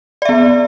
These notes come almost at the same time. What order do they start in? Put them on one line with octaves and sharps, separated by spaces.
D5 E5 B3